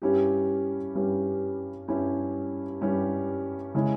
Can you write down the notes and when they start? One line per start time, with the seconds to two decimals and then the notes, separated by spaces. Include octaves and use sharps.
0.02 G2 G3 C#4 E4 G4
0.95 G2 G3 C#4 E4 G4
1.88 G2 G3 C#4 E4 G4
2.81 G2 G3 C#4 E4 G4
3.75 C#3 G#3 C#4 E4